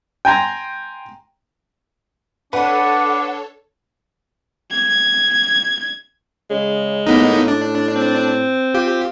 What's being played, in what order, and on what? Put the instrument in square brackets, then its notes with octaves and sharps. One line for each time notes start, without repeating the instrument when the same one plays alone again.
[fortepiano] G5 G#5 A#5 C6
[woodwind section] D4 [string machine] A4 C#5 [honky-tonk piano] B4 [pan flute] F#5
[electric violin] G#6
[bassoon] C#3 [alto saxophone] G#3
[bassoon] A2 [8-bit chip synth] A#3 B3 D#4
[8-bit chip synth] D4
[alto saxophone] C4
[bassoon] F4 [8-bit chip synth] G4